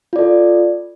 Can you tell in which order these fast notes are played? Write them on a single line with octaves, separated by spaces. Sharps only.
F4 D5 A4